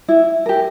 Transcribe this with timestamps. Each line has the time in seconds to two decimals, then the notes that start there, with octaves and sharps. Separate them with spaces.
0.09 E4
0.46 G4 A#4